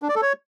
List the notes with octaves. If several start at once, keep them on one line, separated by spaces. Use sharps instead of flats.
D4
D5
A4
C#5